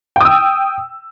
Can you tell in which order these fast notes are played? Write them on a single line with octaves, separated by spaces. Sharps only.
G5 D#6 E6